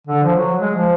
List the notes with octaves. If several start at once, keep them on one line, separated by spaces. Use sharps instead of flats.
D3
F3
F#3
G#3
F3